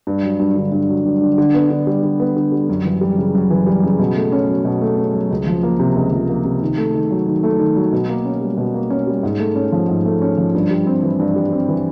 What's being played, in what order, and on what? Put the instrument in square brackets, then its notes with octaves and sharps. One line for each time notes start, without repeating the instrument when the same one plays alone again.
[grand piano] G2
F#3
G2
D3
G2
F#3
G2
D3
D3
B3
D3
G3
D3
B3
D3
G3
F#2
E3
G3
C#3
F#2
E3
G3
C#3
B2
A3
C#4
F#3
B2
A3
C#4
F#3
C#2
F3
A#3
C3
C#2
F3
A#3
C3
D#3
A3
D#3
F#3
D#3
A3
D#3
F#3
B2
A#3
C#4
G3
B2
A#3
C#4
G3
G#2
A3
C#4
F3
G#2
A3
C#4
F3
G2
G3
C4
E3
G2
G3
C4
E3